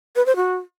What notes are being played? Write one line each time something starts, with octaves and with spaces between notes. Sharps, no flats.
B4
C5
F#4